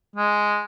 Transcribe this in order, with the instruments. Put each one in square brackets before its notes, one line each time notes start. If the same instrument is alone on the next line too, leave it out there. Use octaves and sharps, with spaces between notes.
[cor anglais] G#3